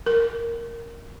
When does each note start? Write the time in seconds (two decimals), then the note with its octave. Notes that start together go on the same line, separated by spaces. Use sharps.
0.06 A#4